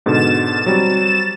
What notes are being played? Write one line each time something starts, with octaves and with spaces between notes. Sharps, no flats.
G#2 B2 D3 A6 E7
F#3 G3 C4